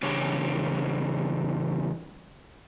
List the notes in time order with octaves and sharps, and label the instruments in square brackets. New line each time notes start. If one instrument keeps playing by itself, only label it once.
[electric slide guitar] E2 C#3 D4 G4 C#5